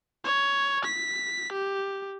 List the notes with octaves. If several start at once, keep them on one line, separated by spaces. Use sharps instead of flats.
C#5
B6
G4